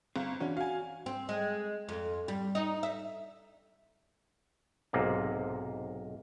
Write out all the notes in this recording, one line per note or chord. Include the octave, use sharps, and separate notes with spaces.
G1 C4 F5
E3 C#4 D4 F#4
F#4 F5 G#5
C4
G#3
F2
G3
D#4
E5
B1 G#2 C3 A#3